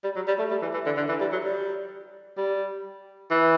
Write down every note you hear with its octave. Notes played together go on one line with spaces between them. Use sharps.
G3
F#3
G3
A3
G3
E3
E3
D3
D3
E3
G3
F#3
G3
G3
E3